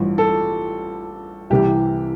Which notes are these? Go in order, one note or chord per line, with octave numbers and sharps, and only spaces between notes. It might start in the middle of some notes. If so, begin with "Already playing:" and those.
Already playing: A1 G2 F3
A4
C2 C3 E3 G4